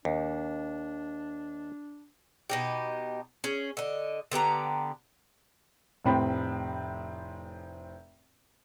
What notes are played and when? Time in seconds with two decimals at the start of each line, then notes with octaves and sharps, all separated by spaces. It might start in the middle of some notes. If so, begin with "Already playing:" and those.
0.05 D#2 D4
2.49 B2 D#4 G4
3.44 C#4 G#4
3.77 D3 D#5
4.31 D3 B3 G4 A#5
6.05 F1 A2 C4 B5